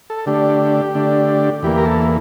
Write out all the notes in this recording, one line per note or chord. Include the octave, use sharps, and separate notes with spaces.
A4
D3 A3 D4 G4
D3 A3 D4
E2 E3 A#3 G4
A#4
A4